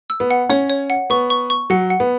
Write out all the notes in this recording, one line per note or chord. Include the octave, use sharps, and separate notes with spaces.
E6
B3
F#5
C#4 C#5
C#5
F#5
B3 C#6
C#6
C#6
F#3 F#5
F#5
B3